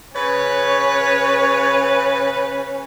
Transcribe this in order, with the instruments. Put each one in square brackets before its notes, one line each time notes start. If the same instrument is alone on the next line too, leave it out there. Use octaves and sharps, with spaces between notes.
[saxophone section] C#3 B4 [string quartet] C#4 [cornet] C#5